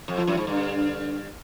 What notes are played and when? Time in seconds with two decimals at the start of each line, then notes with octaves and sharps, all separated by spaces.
0.08 F2
0.18 F3
0.27 F#2
0.37 G#2
0.47 G2 D3